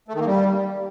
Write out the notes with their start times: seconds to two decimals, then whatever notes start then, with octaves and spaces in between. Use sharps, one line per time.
0.08 A3
0.14 D#3
0.20 A#3
0.26 G3